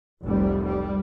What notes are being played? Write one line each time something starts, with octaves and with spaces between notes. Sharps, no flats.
F1 C2 G3
G3